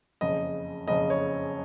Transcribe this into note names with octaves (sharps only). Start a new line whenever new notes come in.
F#1 F2 C#3 D#5
F#1 F2 C#3 D#5
C#5